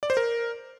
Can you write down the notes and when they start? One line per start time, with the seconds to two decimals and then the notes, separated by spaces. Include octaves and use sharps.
0.03 D5
0.10 C5
0.17 A#4